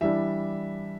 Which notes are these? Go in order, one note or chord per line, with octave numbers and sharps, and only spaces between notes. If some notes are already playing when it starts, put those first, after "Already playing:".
E3 G3 D4 E5